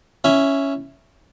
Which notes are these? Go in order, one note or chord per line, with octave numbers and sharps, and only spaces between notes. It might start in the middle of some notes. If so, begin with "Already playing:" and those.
C#4 E4